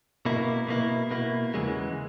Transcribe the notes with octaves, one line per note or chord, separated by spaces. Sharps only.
B2 A#3 E4
B2 A#3 E4
B2 A#3 E4
E2 C#3 E3 G#3